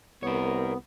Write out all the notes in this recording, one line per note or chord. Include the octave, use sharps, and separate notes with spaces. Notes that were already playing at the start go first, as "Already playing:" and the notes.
C2 B3 A#4 C#5